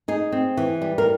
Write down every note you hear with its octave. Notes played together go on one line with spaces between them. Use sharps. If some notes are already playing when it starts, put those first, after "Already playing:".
D#4 G#4
C4
E3
G3
A#4